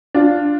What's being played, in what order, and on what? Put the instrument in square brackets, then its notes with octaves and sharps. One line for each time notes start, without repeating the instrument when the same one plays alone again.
[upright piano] D4 F4